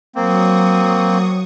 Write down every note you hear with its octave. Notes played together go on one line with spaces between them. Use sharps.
F#3 A#3 C4 C#6 D#6